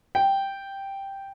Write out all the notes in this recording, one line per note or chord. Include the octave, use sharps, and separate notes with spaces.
G5